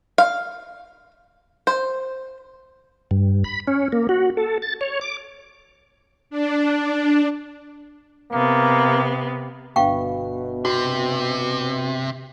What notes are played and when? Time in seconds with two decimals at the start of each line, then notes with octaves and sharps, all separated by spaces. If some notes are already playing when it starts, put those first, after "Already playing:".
0.18 F5
1.67 C5
3.11 G2
3.44 B5
3.67 C#4
3.92 A#3
4.09 F#4
4.37 A4
4.62 A6
4.81 C#5
5.01 D6
6.30 D4
8.33 C3 A#3 B3
9.76 G1 B2 B3 F5 G5 C#6
10.65 C3 F#4